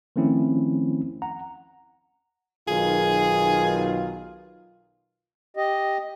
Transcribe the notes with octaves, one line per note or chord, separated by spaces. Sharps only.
D#3 F3 A3 C4 C#4 E4
F#5 A#5
B1 D#3 F4 G#4
G4 D#5